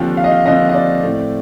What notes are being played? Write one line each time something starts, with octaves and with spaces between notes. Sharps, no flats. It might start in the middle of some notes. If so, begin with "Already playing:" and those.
Already playing: D#2 D3 F3 C4 G5
F5
D#5
F5
D#2 D3 F3 C4 D#5
D#5
D5
A2 A3 C4